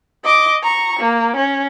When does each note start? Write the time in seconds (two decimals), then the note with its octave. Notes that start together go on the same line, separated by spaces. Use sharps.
0.24 D#5 D6
0.63 A#5 C#6
0.99 A#3
1.36 C#4